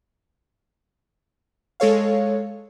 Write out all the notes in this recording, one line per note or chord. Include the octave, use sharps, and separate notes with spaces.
G#3 A4 C#5 F5